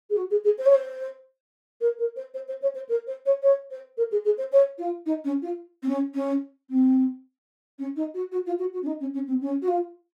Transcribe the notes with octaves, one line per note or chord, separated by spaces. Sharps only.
G#4
F#4
G#4
G#4
C5
C#5
C5
A#4
A#4
C5
C5
C5
C#5
C5
A#4
C5
C#5
C#5
C5
A#4
G#4
G#4
C5
C#5
F4
D#4
C#4
F4
C4
C#4
C#4
C4
C#4
D#4
F#4
F#4
F4
F#4
F#4
C#4
D#4
C#4
C#4
C4
C#4
F#4
F4